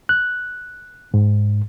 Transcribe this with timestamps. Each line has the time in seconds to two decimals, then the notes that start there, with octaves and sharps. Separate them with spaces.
0.09 F#6
1.14 G#2